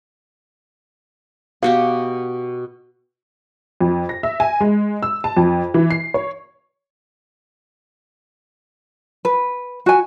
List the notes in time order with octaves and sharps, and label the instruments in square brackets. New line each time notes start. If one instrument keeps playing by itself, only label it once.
[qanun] B2 F#4 G4 [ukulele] F5
[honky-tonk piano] F2
A#6
E5
G#5
G#3
E6
A5
F2
E3
C7
C#5
[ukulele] B4
F#4 G#5